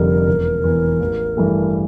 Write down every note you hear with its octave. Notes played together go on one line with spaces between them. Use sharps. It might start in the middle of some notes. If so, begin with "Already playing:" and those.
Already playing: F1 F2 D3 G3 A#4
E1
E2 E3
A1
G2 E3 A3